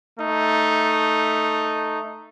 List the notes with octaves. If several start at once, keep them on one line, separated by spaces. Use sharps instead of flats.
A3 D#4